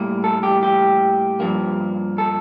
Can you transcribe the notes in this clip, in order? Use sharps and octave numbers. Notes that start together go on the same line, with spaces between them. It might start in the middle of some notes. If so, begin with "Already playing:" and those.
Already playing: A2 G3 A#3
A4
G4
G4
G2 F3 A#3
A4